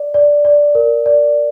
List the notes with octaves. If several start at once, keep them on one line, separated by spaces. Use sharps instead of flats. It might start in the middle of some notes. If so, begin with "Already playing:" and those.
Already playing: D5
D5
D5
A#4
D5